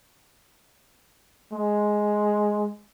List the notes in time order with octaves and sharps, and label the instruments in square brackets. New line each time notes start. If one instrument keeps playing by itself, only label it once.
[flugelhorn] G#3